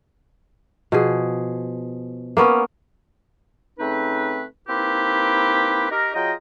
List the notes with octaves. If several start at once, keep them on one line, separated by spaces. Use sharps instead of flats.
B2 F3 G#4
A#3 B3 C#4 A#4
C#3 A3 C4 D#4 B4
A#3 C4 D#4 E4 G4 B4
D#4 G4 A#4
F#3 F4 G#4 D#5 G5 A#5